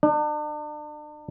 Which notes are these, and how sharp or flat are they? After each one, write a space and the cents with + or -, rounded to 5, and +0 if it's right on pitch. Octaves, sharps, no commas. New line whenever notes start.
D4 +40